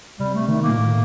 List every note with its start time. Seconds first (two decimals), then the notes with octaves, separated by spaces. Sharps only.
0.20 C3 G3
0.34 A3
0.48 D#3 A3
0.62 A#3
0.69 A#2
0.77 A2